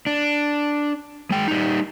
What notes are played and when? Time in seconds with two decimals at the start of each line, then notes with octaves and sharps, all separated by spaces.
0.07 D4
1.31 G#3 G5
1.48 G3 D#4